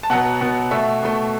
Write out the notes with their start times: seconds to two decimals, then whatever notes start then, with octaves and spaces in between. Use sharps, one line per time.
0.03 A5
0.10 B2 F#3 B3 F#5
0.41 B2 F#3 B3
0.71 B2 A3 E5
1.03 B2 A3